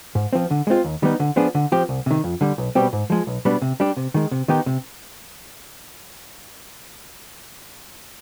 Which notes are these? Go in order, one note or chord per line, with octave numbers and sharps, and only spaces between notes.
G#2
F3 C4
D3
G#3 C4 F4
D#2
D#3 G3 B3 D#4
D3
F3 B3 D4 G#4
D3
F3 C4 G4
C2
C3 D#3
F2
D3 G3
B1
B2 G3 C4 G4
G#2
F3 G#3
B1
B2 G3 B3 D4
C3
G3 D4 G4
C3
D#3 G#3
C3
D#3 B3 D#4 G4
C3